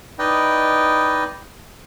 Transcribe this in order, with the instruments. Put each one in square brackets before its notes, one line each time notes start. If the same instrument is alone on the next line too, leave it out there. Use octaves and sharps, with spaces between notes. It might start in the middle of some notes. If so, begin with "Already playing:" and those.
[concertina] D#4 E4 B4 D5 D#5 G5